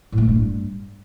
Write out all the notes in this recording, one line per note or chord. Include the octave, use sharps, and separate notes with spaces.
A2
A3
E3
G2